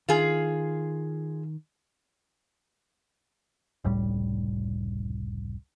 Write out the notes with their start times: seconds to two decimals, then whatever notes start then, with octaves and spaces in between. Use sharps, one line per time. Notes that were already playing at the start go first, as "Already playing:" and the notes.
0.09 D#3 F4 G#4
3.84 F1 C#2 A2 G3